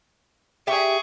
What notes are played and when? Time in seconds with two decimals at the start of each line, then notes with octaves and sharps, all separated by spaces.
0.67 G4 G#4 E5 G5 C#6